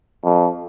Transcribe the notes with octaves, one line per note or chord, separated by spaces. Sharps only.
F2